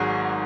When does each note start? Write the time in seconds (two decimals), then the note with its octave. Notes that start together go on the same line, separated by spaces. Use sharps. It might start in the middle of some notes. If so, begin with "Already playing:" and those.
Already playing: G#1 G#2 F#3 G#4